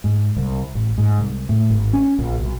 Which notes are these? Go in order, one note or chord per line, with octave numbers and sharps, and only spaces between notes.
G#2
C2
A1
G#2
C2
A2
G#1
C#4
A#1
B1